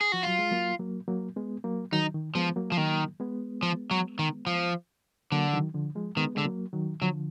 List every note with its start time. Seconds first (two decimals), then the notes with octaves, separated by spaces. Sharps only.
0.01 G#4
0.12 F3 F#4
0.23 F#3 F4
0.39 G#3
0.51 F#3 A#3
0.79 F#3 A#3
1.08 F#3 A#3
1.36 G#3 B3
1.64 F#3 A#3
1.92 D#3 F#3 D#4
2.14 D#3
2.35 F3 G#3 B3
2.56 F#3 A#3
2.72 F3
2.77 D#3 F#3 A#3
3.20 G#3 B3
3.63 F3
3.91 F#3
4.19 D#3
4.47 F3
5.32 D3 F#3 A#3
5.53 D#3 F#3
5.74 D3 F3
5.95 F3 G#3
6.17 D#3 G#3 B3
6.35 D3 G#3
6.45 F#3 A#3
6.73 D#3 F#3
7.02 D3 F3 F#3